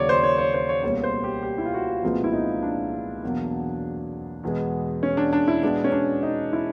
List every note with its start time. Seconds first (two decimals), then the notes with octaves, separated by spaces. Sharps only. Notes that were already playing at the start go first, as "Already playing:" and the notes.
Already playing: D#2 C#3 F#3 A#3 C#5 D5
0.09 C5
0.23 C#5
0.38 C#5
0.54 C5
0.69 C#5
0.83 C#2 B2 G3 A#3 C#5
1.04 C5
1.24 G4
1.43 G4
1.58 E4
1.65 F4
1.74 F#4
2.03 C2 A#2 F3 G#3 B3 F4
2.24 E4
2.33 D#4
2.63 D4
3.23 E2 B2 F#3 A#3
4.43 E2 B2 G#3 B3
5.03 C#4
5.17 D4
5.33 D4
5.48 E4
5.63 B2 G#3 B3 D4
5.84 C#4
5.92 D4
6.23 D#4
6.53 E4